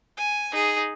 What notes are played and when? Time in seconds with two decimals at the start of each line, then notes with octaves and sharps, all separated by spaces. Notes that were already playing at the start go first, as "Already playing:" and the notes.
0.17 G#5
0.52 D#4 G#4